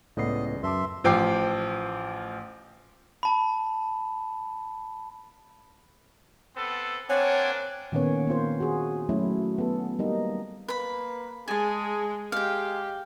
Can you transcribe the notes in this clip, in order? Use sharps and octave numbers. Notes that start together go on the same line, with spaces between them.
C#2 A2 B3 D5 D#5 C7
F#2 B4 E5 A5 C6 D6
A1 F3 G5 D6 C7
A5 B5
B3 C4 A4
A#3 C4 D4 C#5 F#5 G#5
A#2 D#3 A#3 B3 C#4 C#5
A#3 C4 F4 C5
F#4 G#4
F#3 A3 C#4 E4
B3 A4
G3 A#3 D#4
A#3 B4 B5
G#3 G#4 G#5 A5
G#3 G4 F5 G5